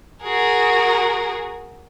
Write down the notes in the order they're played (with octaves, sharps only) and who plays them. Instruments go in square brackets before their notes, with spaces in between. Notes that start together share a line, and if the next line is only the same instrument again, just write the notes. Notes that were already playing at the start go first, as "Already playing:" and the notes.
[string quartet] F#4 G#4 A#4